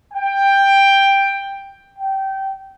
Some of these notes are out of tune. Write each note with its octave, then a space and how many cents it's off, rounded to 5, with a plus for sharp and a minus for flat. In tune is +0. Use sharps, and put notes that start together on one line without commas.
G5 +10
G5 -20